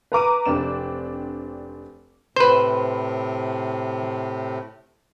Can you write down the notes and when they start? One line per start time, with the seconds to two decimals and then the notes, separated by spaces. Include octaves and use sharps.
0.12 B4 A#5 D6 D#7
0.46 F1 C4 D4 E7
2.36 A2 C3 B4 C5